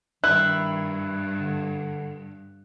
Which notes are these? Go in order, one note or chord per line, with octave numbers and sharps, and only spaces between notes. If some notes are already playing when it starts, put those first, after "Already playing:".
G2 D#3 E4 F#6
D3